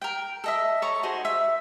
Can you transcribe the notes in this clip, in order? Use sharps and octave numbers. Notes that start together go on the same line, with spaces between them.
A#4 G5
A4 D#5 E5
A4 C#5 A#5 C#6
D#4 F#4 G#4 C5
E5